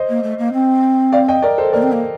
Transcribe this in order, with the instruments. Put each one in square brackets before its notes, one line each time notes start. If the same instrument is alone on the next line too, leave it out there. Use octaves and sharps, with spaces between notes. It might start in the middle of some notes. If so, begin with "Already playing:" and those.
Already playing: [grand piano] C5 D#5
[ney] A#3
A3
A#3
C4
[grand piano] D5 F5
D#5 G5
A#4 D5
A4 C5
[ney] A#3 [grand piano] A#4 D5
[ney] C4
A#3